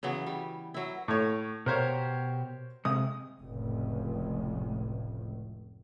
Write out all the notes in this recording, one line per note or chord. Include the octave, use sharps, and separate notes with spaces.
C#3 E3 F#3 B3
G3
F#3 E4
A2 C#5
B2 G4 A#4 C5 C#5
C3 G#3 D#6
F1 C#2 A2